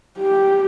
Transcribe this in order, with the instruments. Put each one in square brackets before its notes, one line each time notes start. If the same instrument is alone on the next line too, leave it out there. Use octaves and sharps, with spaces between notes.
[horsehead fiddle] G4